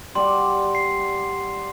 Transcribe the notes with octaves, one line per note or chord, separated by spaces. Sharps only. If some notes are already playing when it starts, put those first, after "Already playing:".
G3 D5 F#5 C6
C7